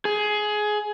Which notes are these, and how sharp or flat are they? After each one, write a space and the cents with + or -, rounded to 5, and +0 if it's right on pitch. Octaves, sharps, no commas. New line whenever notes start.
G#4 +15